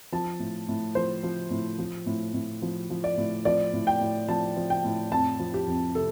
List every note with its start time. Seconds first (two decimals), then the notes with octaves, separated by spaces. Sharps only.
0.12 F3 A5
0.40 A2
0.68 A2
0.95 F3 C5
1.23 F3
1.51 A2
1.79 F3
2.06 A2
2.34 A2
2.62 F3
2.90 F3
3.04 D5
3.18 A2
3.45 F3 D5
3.73 A2
3.87 G5
4.01 A2
4.28 F3 A5
4.56 F3
4.70 G5
4.84 A2
5.12 F2 A5
5.39 F3
5.54 G4
5.67 F2
5.95 C3 A4